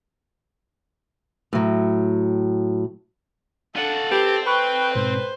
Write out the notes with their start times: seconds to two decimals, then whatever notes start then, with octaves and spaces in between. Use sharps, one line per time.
1.53 A2 F#3
3.76 D4 F4 A4 F#5
4.11 C4 G4 B4
4.46 B4 G5 B5 C#6 F#6
4.95 G#2 B2 C5